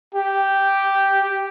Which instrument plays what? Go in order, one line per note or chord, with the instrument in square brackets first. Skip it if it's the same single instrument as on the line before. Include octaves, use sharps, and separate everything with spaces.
[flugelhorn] G4